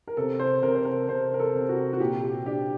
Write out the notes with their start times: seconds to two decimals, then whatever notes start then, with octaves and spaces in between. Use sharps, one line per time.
0.08 A#4
0.17 C3 A4
0.40 C5
0.62 C3 A#4
0.75 C5
0.85 A#4
1.09 C3 C5
1.34 A#4
1.40 A4
1.55 C3
1.69 F#4
1.93 F#4
2.00 A#2 G4
2.23 G4
2.46 D4 G4